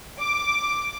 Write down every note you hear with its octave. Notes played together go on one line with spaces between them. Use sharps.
D6